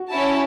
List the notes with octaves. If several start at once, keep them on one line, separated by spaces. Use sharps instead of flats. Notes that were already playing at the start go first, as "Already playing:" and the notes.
Already playing: F#4
C#4 E4 C#5 A5